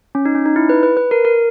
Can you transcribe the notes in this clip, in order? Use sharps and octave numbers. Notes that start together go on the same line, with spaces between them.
C#4
D#4
C#4
D#4
E4
B4
B4
B4
A#4
A#4